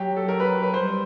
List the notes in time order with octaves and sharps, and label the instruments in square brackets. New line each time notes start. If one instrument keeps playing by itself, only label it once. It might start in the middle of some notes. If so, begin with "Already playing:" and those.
Already playing: [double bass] F#3 [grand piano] G4
[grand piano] A4
A#4
B4
B4
[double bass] G3 [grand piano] C5